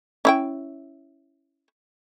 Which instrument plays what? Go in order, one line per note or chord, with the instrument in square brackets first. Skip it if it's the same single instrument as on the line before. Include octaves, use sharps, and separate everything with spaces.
[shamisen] C#4 E4 G5